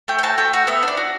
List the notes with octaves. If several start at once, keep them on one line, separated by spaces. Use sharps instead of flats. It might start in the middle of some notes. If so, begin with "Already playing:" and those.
A3 G5
G5
F#4 A5
A3 G5
F#4 F#5
B3 E5
D4
D5
F#4